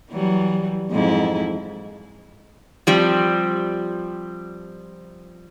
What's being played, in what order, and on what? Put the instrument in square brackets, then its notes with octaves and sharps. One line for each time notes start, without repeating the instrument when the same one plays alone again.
[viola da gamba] E3 F#3 G3
F2 G#2 E4
[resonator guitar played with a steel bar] F3 G3 C4